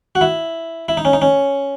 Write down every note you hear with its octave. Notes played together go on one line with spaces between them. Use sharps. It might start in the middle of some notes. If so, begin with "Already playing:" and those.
F#4
E4
E4
D#4
C#4
D#4
C#4